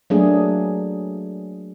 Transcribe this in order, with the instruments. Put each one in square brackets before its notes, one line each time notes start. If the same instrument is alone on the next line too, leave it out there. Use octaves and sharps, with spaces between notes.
[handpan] F#3 A3 A#3 D4 G#4